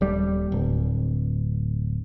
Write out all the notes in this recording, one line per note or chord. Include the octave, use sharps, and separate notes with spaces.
D#1 G3
D1